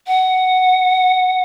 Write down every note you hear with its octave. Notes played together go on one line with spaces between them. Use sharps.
F#5